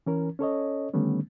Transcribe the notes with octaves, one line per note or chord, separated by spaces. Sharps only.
E3 C#4 A#4
C#4 A4 C#5 D#5
D3 D#3 G3 A3 B3 C#4